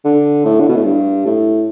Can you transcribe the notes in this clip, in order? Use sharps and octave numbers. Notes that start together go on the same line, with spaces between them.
D3
A2
D3
B2
A2
G2
A2